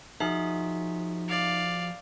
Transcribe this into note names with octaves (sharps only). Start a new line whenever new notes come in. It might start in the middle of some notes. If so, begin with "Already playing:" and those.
F3 D#4 F#4 G#4 E5
D5 F5